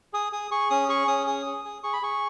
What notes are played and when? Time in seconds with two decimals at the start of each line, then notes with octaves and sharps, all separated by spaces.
0.13 G#4 D#6
0.32 G#4 D#6
0.51 G#4 C#6
0.70 C#4 D#6
0.89 G#4 C#6
1.08 C#4 D#6
1.27 G#4 D#6
1.46 G#4
1.65 G#4
1.83 G#4 C#6
1.93 B5
2.02 G#4 C#6